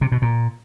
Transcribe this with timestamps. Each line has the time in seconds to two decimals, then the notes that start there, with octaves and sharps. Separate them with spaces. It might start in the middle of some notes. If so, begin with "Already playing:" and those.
0.01 C3
0.12 B2
0.22 A#2